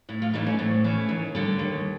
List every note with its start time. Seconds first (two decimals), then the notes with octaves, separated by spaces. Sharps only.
0.09 A2 E4
0.22 F4
0.34 E3 A3 D#4
0.46 C#4
0.59 A2 C4
0.84 E3 A3 C#4
1.09 D#2
1.35 D3 G3
1.59 D#2